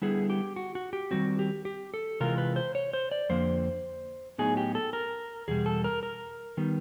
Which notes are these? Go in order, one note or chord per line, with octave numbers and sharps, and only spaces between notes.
D3 G3 B3 E4 G#4
G4
F#4
F#4
G4
D#3 G3 C4 F#4
G4
G4
A4
C3 E3 G#3 F4 A#4
B4
C5
C#5
C5
D5
F2 D3 F3 A#3 C5
A2 F#3 B3 D#4 G#4
G4
A4
A#4
E2 B2 G3 G#4
A4
A#4
A#4
D#3 G3 B3